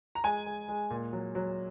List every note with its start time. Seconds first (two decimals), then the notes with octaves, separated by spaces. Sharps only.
0.15 A#5
0.24 G#3 G#5
0.46 G#3
0.68 G#3
0.90 A#2
1.13 F#3
1.35 F#3